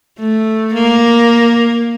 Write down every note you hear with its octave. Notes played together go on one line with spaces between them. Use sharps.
A3
A#3